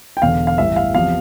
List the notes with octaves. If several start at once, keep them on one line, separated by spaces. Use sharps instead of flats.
G5
E1 E2 D3 F5
F5
A1 G2 E3 E5
F5
E2 C3 F3 F5